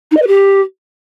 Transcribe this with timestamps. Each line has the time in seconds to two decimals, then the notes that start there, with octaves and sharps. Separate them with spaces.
0.11 D#4
0.16 D#5
0.22 B4
0.27 G4